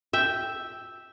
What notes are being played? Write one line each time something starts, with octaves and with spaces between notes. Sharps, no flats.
E5 G5